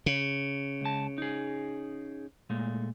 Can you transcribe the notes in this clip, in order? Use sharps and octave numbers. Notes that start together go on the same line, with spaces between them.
C#3
C#2 A5
D#4 G#4
A#2 G#3 A3